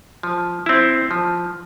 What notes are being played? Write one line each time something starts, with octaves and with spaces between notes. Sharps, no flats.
F3
C4 E4
F3